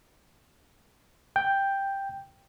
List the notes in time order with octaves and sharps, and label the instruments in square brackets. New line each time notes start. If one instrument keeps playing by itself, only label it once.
[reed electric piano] G5 G6